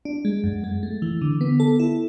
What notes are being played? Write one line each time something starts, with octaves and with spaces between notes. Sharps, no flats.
D4
G#3
F#2
G#3
A3
E3
D3
B3
A4
E4